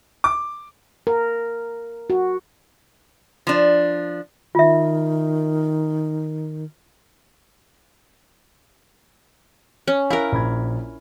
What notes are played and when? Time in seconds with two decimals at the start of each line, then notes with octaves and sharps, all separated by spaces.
0.24 D6
1.07 A#4
2.10 F#4
3.47 F3 D4
4.55 D#3 F4 E5
9.87 C#4
10.10 E4 A#4 F5 F6 F#6
10.32 A#1 B5 G#6